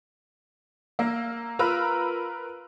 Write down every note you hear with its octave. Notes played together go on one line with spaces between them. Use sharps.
A#3 E6 A#6
F4 A#4 B4 A#5 B5 E6